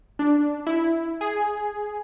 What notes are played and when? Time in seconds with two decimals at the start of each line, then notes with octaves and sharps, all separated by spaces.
0.19 D4
0.67 E4
1.21 G#4